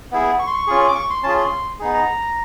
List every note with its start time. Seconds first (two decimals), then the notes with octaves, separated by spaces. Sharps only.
0.12 B3 E4 G#4
0.39 C#6
0.47 C6
0.54 C#6
0.67 C#4 F4 G#4
0.88 D6
0.95 C#6
1.10 C6
1.23 C#4 F4 G#4 A5
1.37 C6
1.79 B3 D#4 G#4
1.94 A#5